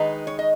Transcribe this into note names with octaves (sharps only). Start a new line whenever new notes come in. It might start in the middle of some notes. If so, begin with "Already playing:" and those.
Already playing: D#3 G#3 D#4 B4
C#5
D#5